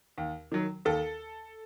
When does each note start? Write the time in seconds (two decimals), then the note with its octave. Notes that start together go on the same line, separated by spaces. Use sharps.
0.18 D#2
0.52 D#3 F#3
0.85 D#2 A4